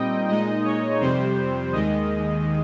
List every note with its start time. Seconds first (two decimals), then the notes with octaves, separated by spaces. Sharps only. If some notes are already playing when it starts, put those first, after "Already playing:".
Already playing: A#2 G3 C4 D#4 D#5 G5
0.29 A#2 G#3 D#4 D#5
0.65 C#5
1.01 F2 C3 G3 C5
1.73 D#2 D#3 G#3 D#5